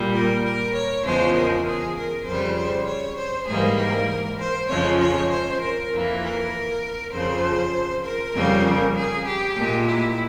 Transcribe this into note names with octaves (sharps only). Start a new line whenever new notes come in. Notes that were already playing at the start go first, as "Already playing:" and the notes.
Already playing: A#2 G3
A#4
A#4
C#5
E2 C#3 F3 G#3 C5
A#4
G#4
A#4
F2 C#3 G3 C5
C5
C#5
C5
G#2 E3 G3 A#3 G#4
A#4
C5
F2 C#3 F3 G#3 C#5
C#5
C5
A#4
F2 E3 A#3
A#4
F2 C#3 F3 C5
A#4
F2 C#3 G3 A#3
G#4
G4
A#2 G#3
E4